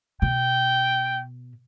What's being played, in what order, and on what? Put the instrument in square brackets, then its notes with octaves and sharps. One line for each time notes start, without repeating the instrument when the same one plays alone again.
[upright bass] B2 [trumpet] G5